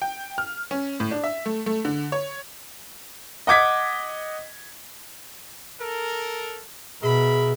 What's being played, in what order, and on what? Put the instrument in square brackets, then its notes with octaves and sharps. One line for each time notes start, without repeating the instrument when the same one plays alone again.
[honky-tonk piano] G5
F6
C#4
A2
D4
E5
A3
A3
D3
C#5
[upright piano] D#5 F#5 D6 G#6 B6
[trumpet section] A4 A#4
[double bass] B2 [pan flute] G#4 [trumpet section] A#4 E5 B5